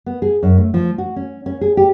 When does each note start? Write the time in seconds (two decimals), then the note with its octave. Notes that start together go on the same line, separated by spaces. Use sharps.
0.06 B3
0.22 G#4
0.43 F#2
0.58 A3
0.74 F3
0.98 F#4
1.16 C#4
1.46 C#4
1.61 G#4
1.77 G4